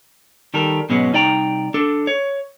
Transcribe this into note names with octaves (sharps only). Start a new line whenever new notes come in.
D#3 G3 A4 A#4
G#2 B2 F#3 G#3 B3 C#4
C2 D#4 D5 G5 A#5
D4 A4
C#5